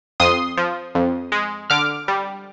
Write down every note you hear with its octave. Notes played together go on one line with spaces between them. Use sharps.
F2 C6 D#6
F3
F2
G#3
D3 D6 F6
G3